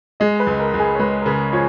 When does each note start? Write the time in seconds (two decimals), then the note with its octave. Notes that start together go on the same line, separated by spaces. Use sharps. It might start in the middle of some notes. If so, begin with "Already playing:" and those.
0.20 G#3 D#5
0.40 B4
0.47 C#2
0.60 A#4
0.74 C#2
0.80 G#4
0.95 C#5
0.99 G#3 B4
1.22 A#4
1.26 C#3 B4
1.53 F3 C#5